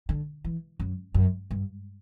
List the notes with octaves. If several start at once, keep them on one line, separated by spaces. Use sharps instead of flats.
D3
E3
F#2
F#2
G2